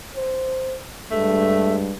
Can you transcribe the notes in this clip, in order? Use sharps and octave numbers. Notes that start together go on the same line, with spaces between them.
C5
G2 G#3 A3